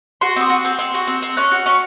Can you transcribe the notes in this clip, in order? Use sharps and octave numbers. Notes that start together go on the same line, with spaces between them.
F#4 C6
C4 D#6
F#4
C4
C4
F#4
C4
C4
C#4 F#6
F#4
C#4